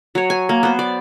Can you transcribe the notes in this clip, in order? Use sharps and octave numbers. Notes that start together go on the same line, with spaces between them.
F#3 C#5
G#5
A#3
B3 C5
D5